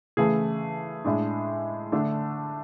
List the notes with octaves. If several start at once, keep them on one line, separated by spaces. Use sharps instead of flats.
C#3 E3 A3 G#4
A2 G#3 D4
D3 A3 D4